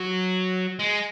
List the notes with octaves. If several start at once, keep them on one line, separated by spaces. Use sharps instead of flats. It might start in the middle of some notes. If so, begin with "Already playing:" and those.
Already playing: F#3
G#3